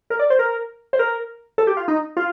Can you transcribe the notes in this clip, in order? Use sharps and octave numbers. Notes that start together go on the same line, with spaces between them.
A#4
D5
C5
A#4
C5
A#4
A4
G4
F4
D#4
F4